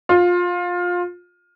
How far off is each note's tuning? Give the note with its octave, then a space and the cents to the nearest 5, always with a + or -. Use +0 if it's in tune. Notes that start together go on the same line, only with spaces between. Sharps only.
F4 +20